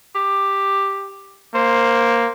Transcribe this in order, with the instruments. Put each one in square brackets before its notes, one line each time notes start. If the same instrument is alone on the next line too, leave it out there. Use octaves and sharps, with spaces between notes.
[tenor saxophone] G4
[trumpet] A#3 [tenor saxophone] C5